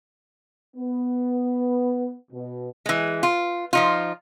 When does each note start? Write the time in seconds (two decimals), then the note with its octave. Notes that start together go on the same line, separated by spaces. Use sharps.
0.76 B3
2.31 B2
2.86 E3 G#3
3.23 F4
3.73 F3 D#4 F4